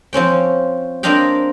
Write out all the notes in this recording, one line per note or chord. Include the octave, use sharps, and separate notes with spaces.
F3 C4 C#4 G5
A#3 C4 D4 D#5 F5 G5